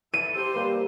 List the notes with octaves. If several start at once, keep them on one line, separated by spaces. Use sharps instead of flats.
E3 E4 A4 D#7
C4 G4 C5
G3 A#3 B4